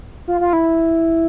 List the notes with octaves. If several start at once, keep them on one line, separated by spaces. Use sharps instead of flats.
F4
F4
E4